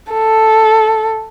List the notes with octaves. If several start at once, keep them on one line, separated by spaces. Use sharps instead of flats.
A4